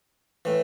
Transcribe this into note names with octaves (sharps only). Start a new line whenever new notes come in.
A2 E3